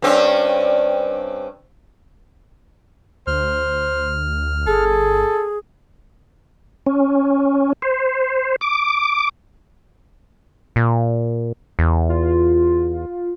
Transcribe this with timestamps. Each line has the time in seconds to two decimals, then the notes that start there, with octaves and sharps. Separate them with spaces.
0.02 G2 C4 C#4
3.27 D2 C5 F6
4.67 G1 G#4 A4
6.86 C#4
7.82 C5
8.61 D6
10.76 A#2
11.79 E2
12.09 F4